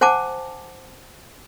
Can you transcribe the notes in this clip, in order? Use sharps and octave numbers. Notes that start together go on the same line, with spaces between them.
C5 F#5 G#5 A5 D6